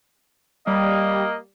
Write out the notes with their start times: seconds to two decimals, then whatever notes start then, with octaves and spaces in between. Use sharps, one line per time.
0.67 G3 A#3 D#5